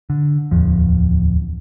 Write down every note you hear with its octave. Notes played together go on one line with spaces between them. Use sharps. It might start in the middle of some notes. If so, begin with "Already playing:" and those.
D3
D1 E2 F3